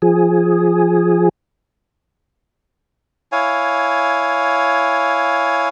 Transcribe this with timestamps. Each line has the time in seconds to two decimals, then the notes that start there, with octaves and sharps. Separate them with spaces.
0.02 F3 G#4
3.32 E4 C#5 F5 G#5